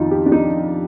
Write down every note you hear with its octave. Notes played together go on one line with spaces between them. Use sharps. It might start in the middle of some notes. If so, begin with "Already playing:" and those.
Already playing: F2 C3 D#3 D#4 F4
G4
D4
D#4